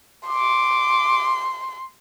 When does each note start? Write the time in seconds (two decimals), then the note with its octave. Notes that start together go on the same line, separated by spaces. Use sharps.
0.28 C6 D6